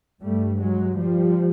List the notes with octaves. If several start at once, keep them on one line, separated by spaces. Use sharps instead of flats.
G2 G3 A3
F#3 G#3
F3 G3